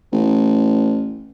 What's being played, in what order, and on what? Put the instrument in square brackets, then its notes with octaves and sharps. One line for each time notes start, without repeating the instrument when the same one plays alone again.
[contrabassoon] A1